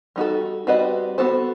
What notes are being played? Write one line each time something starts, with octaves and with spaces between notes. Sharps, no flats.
G3 D#4 F#4 A4
G3 C4 F#4 B4 D#5
B3 F#4 A4 C5